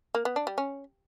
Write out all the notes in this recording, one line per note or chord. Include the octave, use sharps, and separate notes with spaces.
A#3
B3
D4
G3
C#4